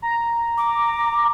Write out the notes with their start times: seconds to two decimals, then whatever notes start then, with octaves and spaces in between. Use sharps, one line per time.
0.02 A#5
0.57 D6